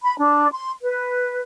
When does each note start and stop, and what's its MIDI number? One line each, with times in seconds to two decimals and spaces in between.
0.02 0.16 83
0.18 0.50 62
0.52 0.72 84
0.82 1.41 71